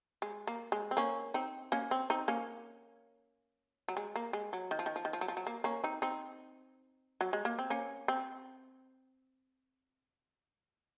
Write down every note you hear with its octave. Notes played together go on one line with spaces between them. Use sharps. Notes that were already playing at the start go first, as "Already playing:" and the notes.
G#3
A#3
G#3
C4
A#3 C#4
C4 D#4
A#3 C#4
C4
C4 D#4
A#3 C#4
F#3
G#3
A#3
G#3
F#3
D#3
F3
D#3
F3
D#3
F3
F#3
F3
F#3
A#3
A#3 C#4
C4 D#4
C4 D#4
F#3
G#3
A#3
C4
A#3 C#4
C4